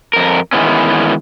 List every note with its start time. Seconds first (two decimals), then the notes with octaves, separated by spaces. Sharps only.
0.13 F2 A#4
0.53 D#3 E3 G#3 B3 C#4